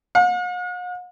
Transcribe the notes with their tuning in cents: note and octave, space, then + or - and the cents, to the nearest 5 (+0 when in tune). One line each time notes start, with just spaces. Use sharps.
F#5 -45